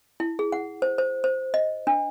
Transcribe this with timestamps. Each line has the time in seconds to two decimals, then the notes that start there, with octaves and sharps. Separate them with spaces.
0.20 E4
0.39 G#4
0.52 F#5
0.82 C5
0.98 C5
1.24 C5
1.54 D#5
1.87 D4